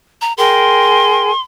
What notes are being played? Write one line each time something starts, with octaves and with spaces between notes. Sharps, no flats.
A#5
G#4 A#4 G5 C6